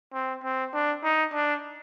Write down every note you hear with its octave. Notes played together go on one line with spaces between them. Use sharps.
C4
C4
D4
D#4
D4